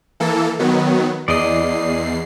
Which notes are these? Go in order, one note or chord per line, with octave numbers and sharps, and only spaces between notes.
E3 A#3 A4
D#3 F#3 B3
E2 D5 D#5 C7